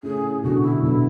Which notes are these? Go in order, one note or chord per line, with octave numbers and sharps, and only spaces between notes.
A2 C#3 G#4
B2 D3 F#4
E4
B2 D3 E4